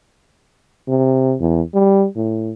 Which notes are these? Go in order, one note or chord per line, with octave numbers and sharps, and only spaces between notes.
C3
E2
G3
A2